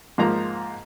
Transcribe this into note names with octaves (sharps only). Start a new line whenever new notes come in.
G#2 F3 A#3 A#5